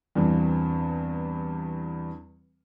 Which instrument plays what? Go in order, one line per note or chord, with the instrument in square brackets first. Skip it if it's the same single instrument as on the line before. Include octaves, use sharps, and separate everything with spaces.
[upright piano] E2 G2 E3 C4